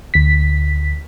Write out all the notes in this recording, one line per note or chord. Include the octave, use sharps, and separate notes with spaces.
D2 B6